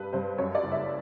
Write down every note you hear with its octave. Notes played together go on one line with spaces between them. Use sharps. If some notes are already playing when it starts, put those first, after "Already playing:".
Already playing: G2 G3 B4
G2 C5
F#2 C#5
D5
F#1
E5